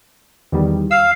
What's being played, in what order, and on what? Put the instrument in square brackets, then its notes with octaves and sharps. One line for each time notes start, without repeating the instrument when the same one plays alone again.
[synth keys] E2 D#3 G3
[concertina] F5 [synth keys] E6 F6